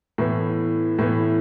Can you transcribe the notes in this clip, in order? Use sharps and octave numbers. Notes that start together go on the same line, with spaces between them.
A2 E3 B3
A2 E3 B3